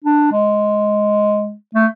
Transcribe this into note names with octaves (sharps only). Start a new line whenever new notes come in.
D4
G#3
A3